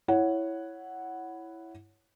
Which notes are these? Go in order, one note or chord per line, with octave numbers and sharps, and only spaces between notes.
E4 C#5 F#5